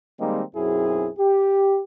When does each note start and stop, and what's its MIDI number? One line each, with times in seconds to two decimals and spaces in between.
0.19 0.42 51
0.19 0.42 55
0.19 0.42 56
0.19 0.42 58
0.19 0.42 60
0.19 0.42 63
0.55 1.09 35
0.55 1.09 42
0.55 1.09 60
0.55 1.09 64
0.55 1.09 68
1.18 1.81 67